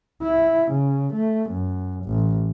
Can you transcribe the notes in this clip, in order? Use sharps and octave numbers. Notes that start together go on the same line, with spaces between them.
E4
C#3
A3
F#2
A1